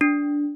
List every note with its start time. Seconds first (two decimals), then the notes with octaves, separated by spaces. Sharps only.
0.01 D4